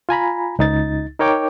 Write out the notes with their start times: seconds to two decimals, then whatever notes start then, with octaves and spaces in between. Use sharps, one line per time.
0.09 F4 G#5 A#5 B5
0.59 C#2 D#4 A6
1.19 D#4 A#4 C#5 G5 D6